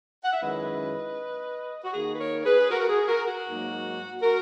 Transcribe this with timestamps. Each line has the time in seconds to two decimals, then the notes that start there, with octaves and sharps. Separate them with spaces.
0.24 F#5
0.33 E5
0.41 F#2 D#3 G#3 C#4 E4 B4 D#5
1.84 F#4
1.93 D#3 A#3 D#4 G#4
2.14 B4
2.20 A#4 C#5
2.40 C#5
2.44 G#4 B4
2.59 G#4
2.70 F#4 A#4
2.80 A#4
2.89 G#4
3.08 F#4 A#4
3.27 F#4
3.46 G#2 F#3 A#3 D#4
4.22 F#4 A#4